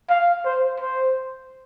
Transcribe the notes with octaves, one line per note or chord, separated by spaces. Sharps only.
F5
C5
C5